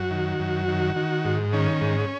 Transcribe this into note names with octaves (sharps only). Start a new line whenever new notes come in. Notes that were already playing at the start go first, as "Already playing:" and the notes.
Already playing: F#2 F#4
D#3
F#2
D#3
D#3
G#2
D#3 C#4
G#2